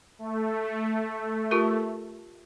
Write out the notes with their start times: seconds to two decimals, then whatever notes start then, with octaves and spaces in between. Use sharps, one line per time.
0.19 A3
1.51 F4 G4 A#4